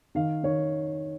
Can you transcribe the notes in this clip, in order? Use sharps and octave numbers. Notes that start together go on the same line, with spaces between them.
D#3 F5
D#3 C#5